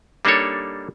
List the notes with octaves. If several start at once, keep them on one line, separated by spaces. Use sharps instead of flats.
G3 A#3 D4 D#4 A4 C#5